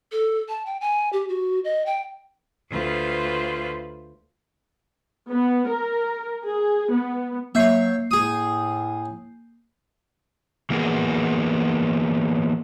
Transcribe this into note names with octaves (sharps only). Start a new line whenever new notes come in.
A4
A5
G5
G#5
G4
F#4
D#5
G5
D2 F4 B4 C5
B3
A#4
G#4
B3
F#3 A#3 C#5 E5 G6 C7
A2 G#4 D#6
E3 A#3 B3 C#4 F#4 G#4